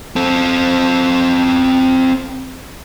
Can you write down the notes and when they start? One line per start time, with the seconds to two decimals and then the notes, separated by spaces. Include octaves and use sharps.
0.16 C4 A4